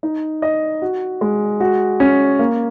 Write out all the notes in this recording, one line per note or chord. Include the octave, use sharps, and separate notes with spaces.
D#4
D#5
F#4
G#3
F#4
C#4
A#3